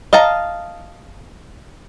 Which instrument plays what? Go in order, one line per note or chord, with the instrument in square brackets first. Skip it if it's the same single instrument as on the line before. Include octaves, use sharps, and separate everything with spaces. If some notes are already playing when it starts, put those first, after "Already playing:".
[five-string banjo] D#5 F5 A5 A#5